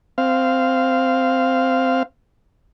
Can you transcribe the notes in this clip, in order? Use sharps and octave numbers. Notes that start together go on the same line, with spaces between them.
C4 F5